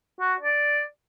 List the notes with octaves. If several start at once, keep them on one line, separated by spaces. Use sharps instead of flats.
F#4
D5